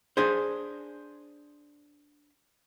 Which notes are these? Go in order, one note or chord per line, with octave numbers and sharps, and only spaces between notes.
D4 G#4 C5